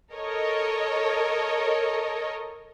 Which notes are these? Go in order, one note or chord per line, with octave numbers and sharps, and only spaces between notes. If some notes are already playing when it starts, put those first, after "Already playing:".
A4 A#4 C#5 D#5